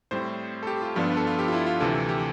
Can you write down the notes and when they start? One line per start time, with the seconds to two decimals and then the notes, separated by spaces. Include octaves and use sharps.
0.11 A2 G3 C4 C5
0.63 A4
0.67 G4
0.82 F4
0.96 G2 F3 B3 D4 F4
1.11 B4
1.17 A4
1.27 F4
1.39 G4
1.48 F4
1.53 E4
1.67 F4
1.80 D2 C3 E3 A4
1.95 A4
2.09 G4